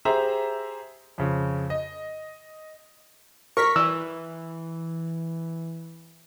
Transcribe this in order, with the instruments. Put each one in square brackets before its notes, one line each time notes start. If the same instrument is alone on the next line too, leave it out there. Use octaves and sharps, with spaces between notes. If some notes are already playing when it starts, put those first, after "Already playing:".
[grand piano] G4 G#4 C5 E5 A#5
F2 C#3
D#5
[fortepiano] A#4 [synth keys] C#6 B6
[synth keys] E3 [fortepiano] E6